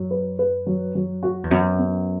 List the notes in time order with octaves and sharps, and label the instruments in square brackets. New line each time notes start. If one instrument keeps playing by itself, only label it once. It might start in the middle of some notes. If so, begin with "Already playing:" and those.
Already playing: [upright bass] F#2 [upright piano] F#3
[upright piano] B4
B4
F#3
F#3
F#4
[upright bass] E2
[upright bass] F#2 [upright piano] B3
[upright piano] B3